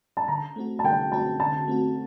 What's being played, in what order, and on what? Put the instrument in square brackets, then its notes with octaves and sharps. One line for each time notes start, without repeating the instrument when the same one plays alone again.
[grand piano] A5
[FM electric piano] D3 [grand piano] A#5
[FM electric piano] A3 C4 F#4
[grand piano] A5
[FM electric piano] D3 [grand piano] G5
[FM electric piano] A3 C4 F#4 [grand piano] A5
[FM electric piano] D3 [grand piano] A5
[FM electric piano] A3 C4 F#4